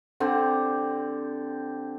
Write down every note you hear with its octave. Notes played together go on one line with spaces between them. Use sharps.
D3 C4 G4